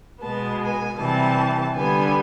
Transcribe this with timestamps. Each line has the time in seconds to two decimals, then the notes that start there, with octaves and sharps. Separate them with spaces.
0.21 B2 G#3 B3 A5
0.61 G#5
0.98 C3 E3 G3 A5
1.75 D3 G3 B3 G#5